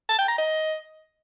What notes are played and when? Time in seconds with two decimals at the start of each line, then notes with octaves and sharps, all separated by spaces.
0.09 A5
0.19 G5
0.28 A#5
0.38 D#5